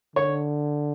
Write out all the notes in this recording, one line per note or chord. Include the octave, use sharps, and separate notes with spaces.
D3 C#5